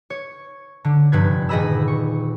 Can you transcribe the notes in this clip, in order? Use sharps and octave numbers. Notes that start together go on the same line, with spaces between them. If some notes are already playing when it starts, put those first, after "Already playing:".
C#5
D3
F1 G2 B4 G#6
D#1 G#4 D#5 B5 E6
C#6